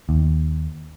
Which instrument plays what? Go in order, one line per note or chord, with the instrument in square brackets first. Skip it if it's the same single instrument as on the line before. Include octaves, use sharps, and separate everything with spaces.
[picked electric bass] D#2